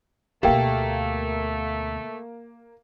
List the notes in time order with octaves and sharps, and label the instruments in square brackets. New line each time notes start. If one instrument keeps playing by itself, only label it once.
[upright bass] D2 B2 [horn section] A3 [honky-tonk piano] A#3 [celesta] G4 E5 G5